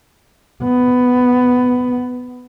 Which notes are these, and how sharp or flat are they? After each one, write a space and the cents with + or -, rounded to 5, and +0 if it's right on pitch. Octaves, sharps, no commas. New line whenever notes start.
B3 +10